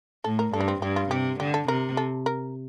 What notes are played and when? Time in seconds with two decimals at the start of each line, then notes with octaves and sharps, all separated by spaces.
0.24 A2 A4
0.39 A#4
0.53 G2 A4
0.60 D4
0.68 C4
0.82 G2 G4
0.96 F4
1.10 C3 G4
1.40 D3 G4
1.54 A4
1.68 C3 A#4
1.97 A4
2.26 A#4